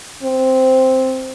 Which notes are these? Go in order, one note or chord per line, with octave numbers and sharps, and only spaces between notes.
C4